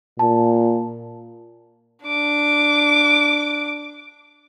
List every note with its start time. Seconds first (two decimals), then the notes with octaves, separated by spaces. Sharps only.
0.19 A#2 A5
2.05 D4 D6